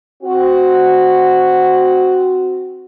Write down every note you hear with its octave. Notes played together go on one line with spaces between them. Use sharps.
C4 F#4